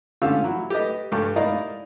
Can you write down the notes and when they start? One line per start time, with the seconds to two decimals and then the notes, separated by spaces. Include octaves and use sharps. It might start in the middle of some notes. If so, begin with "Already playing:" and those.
0.22 D3 C#4 F4 G4 F5 E6
0.44 F#3 E4
0.70 G4 A4 B4 D#5
1.12 G2 G4 A4 G5 C#6
1.36 D#4 E4 A#4 D5 D#5 F5